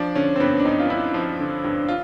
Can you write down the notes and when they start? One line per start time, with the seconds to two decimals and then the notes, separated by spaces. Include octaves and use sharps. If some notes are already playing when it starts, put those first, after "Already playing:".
Already playing: F3 D4
0.15 D3 C#4
0.36 C4
0.40 G2 B3
0.60 D4
0.65 G2 D#4
0.80 F4
0.90 G2 E4
1.14 F3
1.39 D3
1.64 G2
1.88 F4